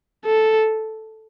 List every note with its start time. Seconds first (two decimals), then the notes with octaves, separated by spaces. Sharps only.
0.25 A4